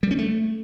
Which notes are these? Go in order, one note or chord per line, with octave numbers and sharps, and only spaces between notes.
G3
C#4
A3